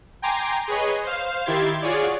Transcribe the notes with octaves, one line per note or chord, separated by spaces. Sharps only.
G5 G#5 A#5 C6 D6
G#4 B4 C#5 D#5
C5 F5
D#3 E4 G4 C6 G#6 A6
F4 F#4 G#4 C#5 D5